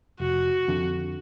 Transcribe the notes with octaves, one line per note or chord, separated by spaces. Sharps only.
F1 F#4
F2 D3